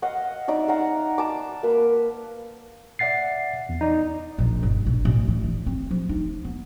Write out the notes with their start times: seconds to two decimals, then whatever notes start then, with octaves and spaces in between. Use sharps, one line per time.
0.02 D#5 F5 F#5
0.48 D#4 D5 E5
0.68 F5 F#5 A#5
1.18 A5 D6
1.63 A#3 B4
2.99 D5 E5 F#5 A6 C7
3.69 E2
3.81 D#4 D5
4.38 A#1
4.63 G1
4.86 A#1
5.05 A1
5.28 E3
5.44 A1
5.67 C4
5.91 F3
6.09 D#4
6.45 B3